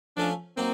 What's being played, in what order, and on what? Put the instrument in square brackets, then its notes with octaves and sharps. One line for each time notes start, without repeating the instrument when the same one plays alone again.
[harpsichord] F3 A3 C#4 F4 [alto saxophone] D4
[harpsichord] F#3 A#3 D#4 [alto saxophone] C4